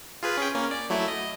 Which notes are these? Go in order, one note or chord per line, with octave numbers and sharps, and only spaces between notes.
F4 G#4 B4
C#4 G#4 G5
A#3 C#4
D5
F#3 A3 E4
D#5